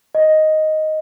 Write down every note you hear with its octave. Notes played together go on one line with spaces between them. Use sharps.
D#5